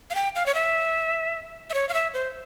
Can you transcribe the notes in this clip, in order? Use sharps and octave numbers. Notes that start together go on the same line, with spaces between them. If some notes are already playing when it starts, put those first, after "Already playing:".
F5
G5
F5
C#5
E5
E5
C#5
F5
E5
C5